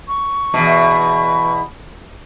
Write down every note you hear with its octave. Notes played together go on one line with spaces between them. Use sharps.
C#6
E2 B2